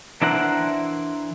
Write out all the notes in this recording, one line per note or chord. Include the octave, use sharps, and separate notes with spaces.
E3 D4 E4 A#4 C5 F#5